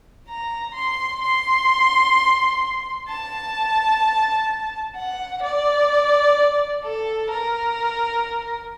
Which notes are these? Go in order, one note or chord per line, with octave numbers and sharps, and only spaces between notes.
A#5
C6
C6
A5
F#5
D5
A4
A#4